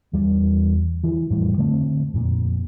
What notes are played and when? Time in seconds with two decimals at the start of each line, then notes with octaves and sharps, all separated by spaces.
0.13 E2 G3
1.03 E3
1.30 F2 A2 G3
1.57 D3 A3 B3 C4
2.14 F2 A#2